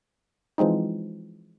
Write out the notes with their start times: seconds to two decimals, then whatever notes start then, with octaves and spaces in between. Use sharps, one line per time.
0.58 E3 F3 G#3 C4 D#4